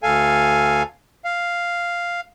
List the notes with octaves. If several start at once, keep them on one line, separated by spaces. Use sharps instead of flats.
D2 A4 F5 G#5
F5